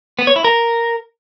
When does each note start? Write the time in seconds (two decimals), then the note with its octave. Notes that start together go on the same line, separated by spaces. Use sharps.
0.19 B3
0.27 C#5
0.36 E4
0.45 A#4